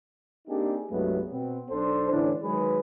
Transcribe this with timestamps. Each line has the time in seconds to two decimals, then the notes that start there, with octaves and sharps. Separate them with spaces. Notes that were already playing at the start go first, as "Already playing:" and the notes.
0.48 A#3 C4 D4 D#4 G4 G#4
0.91 C2 G2 F#3 G#3 A3 B3
1.31 B2 B3 C4
1.71 B1 D4 A4 C5
2.11 A2 D3 E3 C#4 D4
2.43 D#3 F#3 G#3 G#4 B4